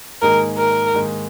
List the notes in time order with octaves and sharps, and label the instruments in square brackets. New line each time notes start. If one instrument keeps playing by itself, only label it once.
[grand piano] G#2 D#3 A#3 D#4 G#4 [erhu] A#4
[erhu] A#4
[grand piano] G#2 D#3 A#3 D#4 G#4